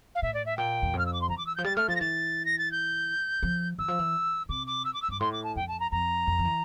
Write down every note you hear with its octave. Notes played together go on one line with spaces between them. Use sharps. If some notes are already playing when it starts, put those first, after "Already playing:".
F5
A2 E5
D5
E5
A#2 G5
E2
F2
F6
E6
D6
C6
E3 A#5
D6
E6
F3 G6
G3 A6
A3 F6
F3 A6
A#6
E3 A6
A#6
A6
G6
F3
E3 E6
F3
E3
C3 D6
D6
E6
D6
E6
G2 D6
A2 C6
D6
A5
F2 G5
A5
A#5
F2 A#5
F2
F3
E3